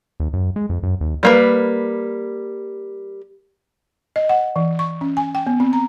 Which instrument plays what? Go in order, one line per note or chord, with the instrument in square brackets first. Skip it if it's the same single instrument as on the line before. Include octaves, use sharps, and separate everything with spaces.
[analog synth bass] D#2
F#2
G#3
F2
F#2
D#2
[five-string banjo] G3 A#3 B4
[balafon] D#5
F#5
E3
C#6
C#4
G#5
G5
B3
C4
A#5